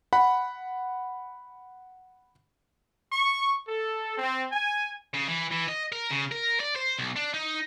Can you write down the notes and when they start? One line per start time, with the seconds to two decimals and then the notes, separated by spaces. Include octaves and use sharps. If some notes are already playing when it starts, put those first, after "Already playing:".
0.13 F#5 B5
3.13 C#6
3.68 A4
4.18 C4
4.51 G#5
5.14 C#3
5.28 E3
5.51 E3
5.68 D#5
5.92 A#4
6.11 C#3
6.32 A#4
6.60 D5
6.76 C5
6.99 B1
7.16 D4
7.34 D#4